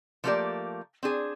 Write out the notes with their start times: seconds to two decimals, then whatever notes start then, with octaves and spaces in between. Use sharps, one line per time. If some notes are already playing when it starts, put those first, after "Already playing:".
0.24 F3 A3 A#3 D#4 G4 D5
1.03 C4 D4 G#4